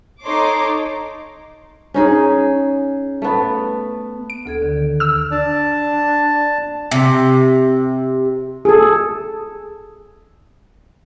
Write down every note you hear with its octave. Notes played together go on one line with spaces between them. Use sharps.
D#4 A4 C#5 C6 D6
C#4 D#4 G#4
A3 B3
D7
D2 A4 G#6
D3 D#3
E6 F6
D4 A5
C3
G#4 A4